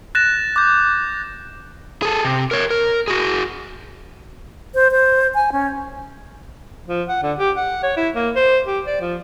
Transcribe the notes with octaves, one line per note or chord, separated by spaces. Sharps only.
F#6 A6 A#6 E7
D6 G6
G#4 A4
C3
A#4 C#5
A#4
F#4 G#4
C5
C5
G#5
C#4
F3
F#5
D3
G4
F#5
C#5
E4
A#3
C5
G4
D5
F3